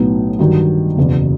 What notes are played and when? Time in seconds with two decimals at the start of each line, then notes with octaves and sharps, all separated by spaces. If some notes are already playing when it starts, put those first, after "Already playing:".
Already playing: B1 A2 F#3 B3 D#4
0.39 G2 D#3 F#3
0.97 F#1 E2 B2